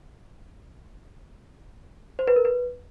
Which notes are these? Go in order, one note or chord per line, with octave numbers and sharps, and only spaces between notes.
C5
B4
A#4
B4